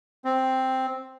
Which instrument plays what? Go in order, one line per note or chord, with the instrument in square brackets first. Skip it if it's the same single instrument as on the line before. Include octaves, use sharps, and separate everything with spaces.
[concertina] C4